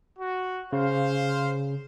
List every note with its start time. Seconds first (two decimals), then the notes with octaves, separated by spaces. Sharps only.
0.19 F#4
0.73 C#3 C5 F5